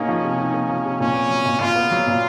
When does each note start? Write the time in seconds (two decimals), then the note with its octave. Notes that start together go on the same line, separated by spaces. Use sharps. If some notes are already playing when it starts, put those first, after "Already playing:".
Already playing: B2 A#3 C#4 D#4
0.08 F3
0.24 C3
0.39 D#4
0.54 A#3
0.70 F3
0.85 C3
1.00 A#2 C#4
1.15 B3
1.30 F#3
1.46 A#2
1.60 A#2 F4
1.76 B3
1.91 F#3
2.07 A#2